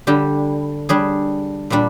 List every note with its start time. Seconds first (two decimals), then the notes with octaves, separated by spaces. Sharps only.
0.07 D3 G3 D4 G4
0.89 G3 D4 G#4
1.70 A#2 G3 D4